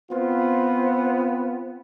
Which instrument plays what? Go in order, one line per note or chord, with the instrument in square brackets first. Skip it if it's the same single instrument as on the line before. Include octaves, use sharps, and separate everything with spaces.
[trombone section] B3 C4 F4